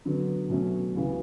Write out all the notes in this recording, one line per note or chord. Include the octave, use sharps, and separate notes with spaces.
D3 F#3 B3 D4
B2 F#3 A3 C#4
C#2 C#3 E3 B3 F#4